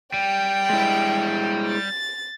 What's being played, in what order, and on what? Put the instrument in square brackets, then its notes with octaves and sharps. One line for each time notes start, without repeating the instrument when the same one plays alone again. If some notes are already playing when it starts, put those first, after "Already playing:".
[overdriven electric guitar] G3 [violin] G5
[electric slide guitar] G#3 E4
[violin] A6